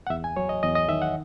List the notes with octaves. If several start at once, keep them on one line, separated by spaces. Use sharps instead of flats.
F#5
E2 E5
G#5
F#3 C#5
D#5
E2 D#5
D#5
D#3 E5
F#5